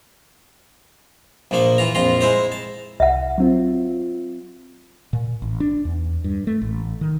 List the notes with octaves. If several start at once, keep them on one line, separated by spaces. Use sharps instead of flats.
A#1 A#2 F3 A#3 A5
E3 F4 A#5
A#1 F2 F4 A#5 C6
G#3 E4 C5 A#5
A5
C2 E5 F#5
F#3 C4 F4
A#2
A1
D4
E2
G2
A3
A1
D#3